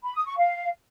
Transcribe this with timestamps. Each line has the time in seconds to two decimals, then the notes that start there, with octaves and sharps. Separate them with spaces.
0.03 B5
0.14 D#6
0.25 C#6
0.36 F5